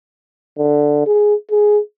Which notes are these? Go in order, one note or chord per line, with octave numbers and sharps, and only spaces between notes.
D3
G#4
G#4